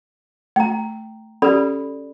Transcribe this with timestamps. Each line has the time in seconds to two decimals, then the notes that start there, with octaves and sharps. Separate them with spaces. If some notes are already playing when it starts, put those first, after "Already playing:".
0.56 A3 G5 A#5
1.42 C#4 G4 A4 D5 B5